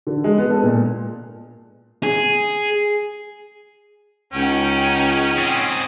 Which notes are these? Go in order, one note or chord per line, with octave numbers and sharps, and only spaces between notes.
D3
G#3
B3
A4
A#2
G#4
C#2 C#4 D#4 F#5 G5
C4 G#4